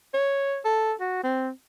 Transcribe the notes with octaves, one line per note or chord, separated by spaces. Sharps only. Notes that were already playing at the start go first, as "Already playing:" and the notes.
C#5
A4
F#4
C4